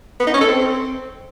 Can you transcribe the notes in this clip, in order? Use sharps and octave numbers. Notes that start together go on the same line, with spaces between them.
B3
D#4
C#4
A4
C4